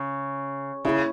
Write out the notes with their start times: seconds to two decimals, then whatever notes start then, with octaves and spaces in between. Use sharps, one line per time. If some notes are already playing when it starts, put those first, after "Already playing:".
Already playing: C#3
0.85 C#3 E4